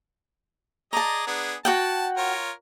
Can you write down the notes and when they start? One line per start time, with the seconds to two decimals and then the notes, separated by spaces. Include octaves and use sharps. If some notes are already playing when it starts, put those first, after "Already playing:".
0.93 G#4 D5 D#5 A5 A#5
1.27 B3 D4 G#4
1.65 F#4 F#5 G5 A5
2.17 F4 A#4 C#5